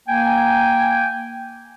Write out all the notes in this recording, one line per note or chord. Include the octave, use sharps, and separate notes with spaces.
A#3 G5 G#5